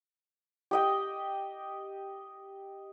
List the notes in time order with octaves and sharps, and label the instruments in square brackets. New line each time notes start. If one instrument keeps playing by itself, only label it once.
[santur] G4 D#5 G5